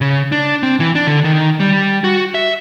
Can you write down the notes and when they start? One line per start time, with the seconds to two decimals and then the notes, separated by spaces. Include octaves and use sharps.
0.01 C#3
0.32 D4
0.63 C4
0.80 E3
0.95 D4
1.07 D3
1.24 D#3
1.60 G3
2.04 F#4
2.35 E5